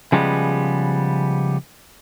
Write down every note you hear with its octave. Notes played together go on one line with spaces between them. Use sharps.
C#3 F3 G3 G#3 B3